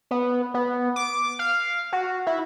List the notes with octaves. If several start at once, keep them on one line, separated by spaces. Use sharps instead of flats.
B3
B3
D6
F5
F#4
E4